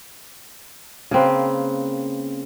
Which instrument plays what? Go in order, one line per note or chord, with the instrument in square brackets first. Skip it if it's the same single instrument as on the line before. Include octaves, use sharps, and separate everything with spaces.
[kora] C#3 A#3 C4 B4